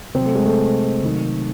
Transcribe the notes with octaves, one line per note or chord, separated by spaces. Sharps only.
C3 F#3 C4
A3
G#3
A3
C3 D#3 F#3